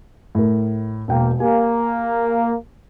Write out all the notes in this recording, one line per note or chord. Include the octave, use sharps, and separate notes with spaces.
A2 A#4
E1 A#3 G5
A#3 G4 G#5